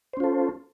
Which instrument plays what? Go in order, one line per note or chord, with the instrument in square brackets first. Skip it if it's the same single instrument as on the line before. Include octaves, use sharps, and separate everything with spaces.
[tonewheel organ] C5
C#4
F4
A4